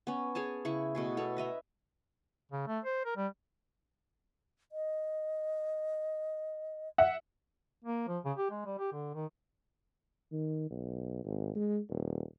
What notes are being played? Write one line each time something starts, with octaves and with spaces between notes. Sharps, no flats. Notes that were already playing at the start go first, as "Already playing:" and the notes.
B3 C#4
G#4 C#5 G#5 A5
C#3 E4 C#6
B2 A3 G#4
B3 A4 C#5
B4 D#5 E5 A#5
C#3
A3
C5
A#4
G3
D#5
E5 F#5
A#3
F3
C#3
G4
G#3
G3
G4
D3
D#3
D#3
B1
G#1
G#3
D#1